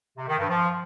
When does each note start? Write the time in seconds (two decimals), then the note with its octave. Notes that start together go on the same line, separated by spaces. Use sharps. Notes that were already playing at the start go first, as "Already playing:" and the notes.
0.17 C3
0.28 D#3
0.38 G2
0.49 F3